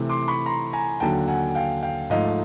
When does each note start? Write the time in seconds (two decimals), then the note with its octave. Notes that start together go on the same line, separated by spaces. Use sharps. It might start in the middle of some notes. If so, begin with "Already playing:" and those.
Already playing: C3 E3 A3
0.09 C6 D6
0.28 B5 C#6
0.46 A#5 C6
0.73 G#5 A#5
1.00 D#2 D3 F#3 G5 A5
1.28 F#5 G#5
1.55 F5 G5
1.83 F5 G5
2.10 G#2 F3 A3 D#5 F5